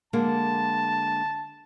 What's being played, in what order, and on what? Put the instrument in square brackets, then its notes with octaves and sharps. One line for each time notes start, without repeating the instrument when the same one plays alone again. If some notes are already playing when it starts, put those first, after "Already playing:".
[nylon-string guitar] D3 G#3 A#3 [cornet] A5